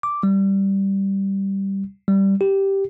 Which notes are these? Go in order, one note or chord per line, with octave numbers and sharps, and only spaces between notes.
D6
G3
G3
G4